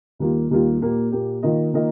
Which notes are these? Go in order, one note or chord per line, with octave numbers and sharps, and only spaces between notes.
D#2 D#3 G3 A#3 F4
D#2 D#3 G3 A#3 F4
A#2 A#3 G4
A#2 A#3 G4
D#3 A#3 F4 A#4 D#5
D#3 A#3 F4 A#4 D#5